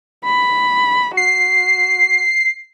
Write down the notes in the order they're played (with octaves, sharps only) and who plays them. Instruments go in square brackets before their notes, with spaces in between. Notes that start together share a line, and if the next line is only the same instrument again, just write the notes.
[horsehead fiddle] B5
[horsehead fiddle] F#4 [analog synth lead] C7